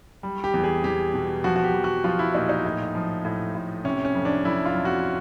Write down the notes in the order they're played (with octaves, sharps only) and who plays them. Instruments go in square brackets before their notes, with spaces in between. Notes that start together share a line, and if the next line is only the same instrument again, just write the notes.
[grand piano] G3
G4
E2
G#4
E2 G4
B2
F3 F#4
F#4
G4
F3
F#4
F3 F4
E4
A#2 D#4
D#4
A2
F3
A2
A2
C3 C#4
C#4
F2
D4
F2 E4
F4
F2
F#4